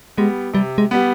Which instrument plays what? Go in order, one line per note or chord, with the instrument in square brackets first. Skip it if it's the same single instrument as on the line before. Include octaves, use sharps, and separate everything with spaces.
[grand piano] G3 B3 [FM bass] G#3
[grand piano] C3 [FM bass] G3
[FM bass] G#3
[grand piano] G3 B3